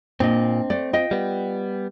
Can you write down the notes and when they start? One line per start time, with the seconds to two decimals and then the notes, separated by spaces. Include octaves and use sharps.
0.20 A#2 C4 D4 D#5
0.70 A3 D5
0.93 F4 D#5 G5
1.11 G3 B3